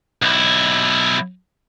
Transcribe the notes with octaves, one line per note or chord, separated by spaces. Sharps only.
B1 E4